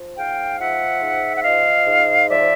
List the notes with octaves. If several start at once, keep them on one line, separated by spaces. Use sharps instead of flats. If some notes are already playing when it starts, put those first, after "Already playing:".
Already playing: F3
G#2 F5 G5
F3 E5 F#5
G#2
F#5
F3 D#5 F5
G#2
F3 D5 E5